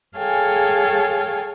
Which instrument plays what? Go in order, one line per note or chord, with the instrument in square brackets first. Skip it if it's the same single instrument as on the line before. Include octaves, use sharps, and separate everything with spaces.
[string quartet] G#4 A4 C#5 F5 G5 G#5